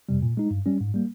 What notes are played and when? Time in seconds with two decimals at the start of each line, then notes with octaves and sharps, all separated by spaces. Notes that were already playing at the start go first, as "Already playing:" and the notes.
0.09 F2 C3 G3
0.22 A#2
0.37 G#3 D#4
0.51 G2
0.66 G3 C#4
0.81 G#2
0.94 G3 A#3